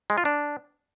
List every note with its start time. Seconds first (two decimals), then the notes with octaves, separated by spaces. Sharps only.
0.10 G#3
0.18 F4
0.25 D4